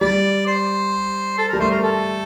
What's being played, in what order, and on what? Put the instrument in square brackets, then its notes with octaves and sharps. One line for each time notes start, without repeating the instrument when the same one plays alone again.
[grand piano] G3 [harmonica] D5
[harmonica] C5
A4
[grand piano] G3 [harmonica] A#4
[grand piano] A3 [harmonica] C5
[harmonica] A#4
A4